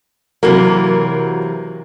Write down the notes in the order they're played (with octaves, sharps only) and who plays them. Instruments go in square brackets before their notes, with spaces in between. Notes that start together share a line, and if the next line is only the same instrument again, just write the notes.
[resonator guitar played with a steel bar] C3 E3 A#3 [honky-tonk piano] F#3 A#4